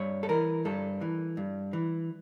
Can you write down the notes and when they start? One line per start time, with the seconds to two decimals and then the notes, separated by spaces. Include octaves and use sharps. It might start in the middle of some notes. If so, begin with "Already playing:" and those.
Already playing: G2 C#5
0.23 A4
0.29 E3 A#4
0.65 G2 A4
1.01 E3
1.37 G2
1.73 E3